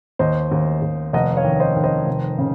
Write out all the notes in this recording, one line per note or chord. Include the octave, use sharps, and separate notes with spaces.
D#2 C5 D#5
D#2
D#2
F1 D#5 F#5
C#5 F5
D#3
C5 D#5
D#3
C5 D#5
F1
C#3